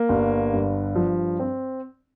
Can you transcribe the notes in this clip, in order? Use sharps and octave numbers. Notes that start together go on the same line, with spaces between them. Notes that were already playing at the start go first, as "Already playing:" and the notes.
Already playing: A#3
G1
G2
F3
C4